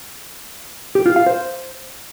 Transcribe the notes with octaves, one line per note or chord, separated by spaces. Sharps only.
G4
F4
F5
C5